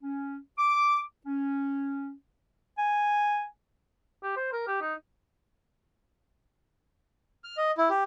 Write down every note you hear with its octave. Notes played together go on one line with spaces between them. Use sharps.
C#4
D6
C#4
G#5
G4
C5
A#4
G4
D#4
F6
D#5
E4
G4